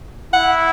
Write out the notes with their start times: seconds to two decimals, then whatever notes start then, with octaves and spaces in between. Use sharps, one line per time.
0.33 E4 F#5